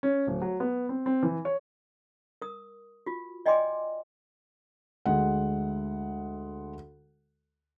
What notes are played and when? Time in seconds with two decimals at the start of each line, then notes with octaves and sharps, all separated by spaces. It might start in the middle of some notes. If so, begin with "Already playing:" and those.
0.03 C#4
0.27 D1
0.42 F#3
0.60 B3
0.89 C4
1.06 C4
1.23 E3
1.45 C#5
2.42 A#4 D#6
3.06 F4 F#4
3.46 D5 D#5 G5 G#5 C6 D6
5.06 D2 G#3 F#5